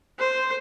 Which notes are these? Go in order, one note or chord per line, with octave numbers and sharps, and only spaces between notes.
C5